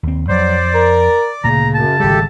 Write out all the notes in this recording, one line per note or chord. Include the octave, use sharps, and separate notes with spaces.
D#2 C4
F2 F#3 C5 D5
A#4
D2 A#2 C#3 A3 A#5
F#2 A5
G#1 D2 G3 G4 A4